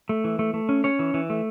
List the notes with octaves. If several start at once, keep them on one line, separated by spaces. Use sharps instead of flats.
A3
E3
A3
A3
C#4
C#4 C#5
E3
E3
A3